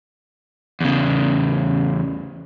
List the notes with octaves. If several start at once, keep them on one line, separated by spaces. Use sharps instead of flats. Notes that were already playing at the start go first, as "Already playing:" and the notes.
E2 C#3